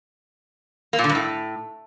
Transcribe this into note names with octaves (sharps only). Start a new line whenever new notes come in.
A#3
A#2
D3
G2
A2